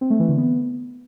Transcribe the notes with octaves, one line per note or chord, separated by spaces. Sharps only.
C4
A3
E3
D3
B3